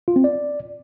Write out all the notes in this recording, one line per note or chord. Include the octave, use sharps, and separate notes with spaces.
F4
C4
D5